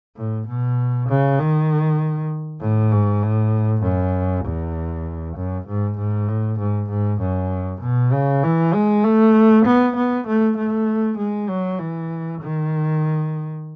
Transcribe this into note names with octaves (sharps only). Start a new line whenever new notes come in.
A2
B2
C#3
D#3
A2
G#2
A2
F#2
E2
F#2
G#2
G#2
A2
G#2
G#2
F#2
B2
C#3
E3
G#3
A3
B3
B3
A3
A3
G#3
F#3
E3
D#3